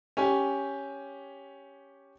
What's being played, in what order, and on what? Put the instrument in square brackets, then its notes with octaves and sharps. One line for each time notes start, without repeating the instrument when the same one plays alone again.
[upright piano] C#4 G4 G#5